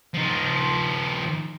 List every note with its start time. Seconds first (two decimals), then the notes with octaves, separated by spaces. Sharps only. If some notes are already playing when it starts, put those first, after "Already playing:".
0.14 F3 D#4